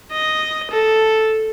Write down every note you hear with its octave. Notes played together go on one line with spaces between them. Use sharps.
D#5
A4